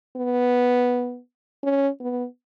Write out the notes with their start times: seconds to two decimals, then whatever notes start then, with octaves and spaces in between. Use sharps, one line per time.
0.17 B3
1.63 C#4
2.00 B3